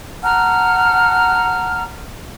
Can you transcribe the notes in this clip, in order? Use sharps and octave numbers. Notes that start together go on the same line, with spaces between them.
F#5 A5 A#5 F6